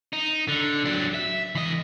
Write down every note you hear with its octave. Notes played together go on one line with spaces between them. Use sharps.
D#4
D3
F#3 D4
E5
E3 D#5